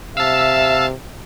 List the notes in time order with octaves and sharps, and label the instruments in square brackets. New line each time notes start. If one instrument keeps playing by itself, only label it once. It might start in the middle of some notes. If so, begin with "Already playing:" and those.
[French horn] C3 [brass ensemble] E5 [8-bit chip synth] F5 A5 [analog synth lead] E6